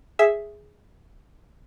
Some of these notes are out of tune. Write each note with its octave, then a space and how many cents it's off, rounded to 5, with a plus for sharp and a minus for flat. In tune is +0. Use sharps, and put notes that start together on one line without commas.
G#4 +0 E5 +0